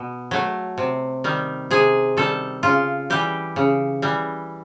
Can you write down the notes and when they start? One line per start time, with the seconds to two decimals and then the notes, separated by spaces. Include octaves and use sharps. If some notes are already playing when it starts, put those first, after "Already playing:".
Already playing: B2
0.31 F#3 A3
0.78 C3
1.24 D#3 G3
1.71 C3 G#4
2.17 D#3 G3 A4
2.63 C#3 F4
3.10 E3 G3 G4
3.56 C#3
4.02 E3 G3